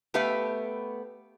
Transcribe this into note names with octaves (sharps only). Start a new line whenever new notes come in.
A3 B3 G4 B4 E5 F5